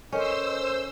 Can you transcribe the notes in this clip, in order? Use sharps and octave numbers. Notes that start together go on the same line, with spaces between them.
C#4 A4 A#4 C5 D#5 G#5 E6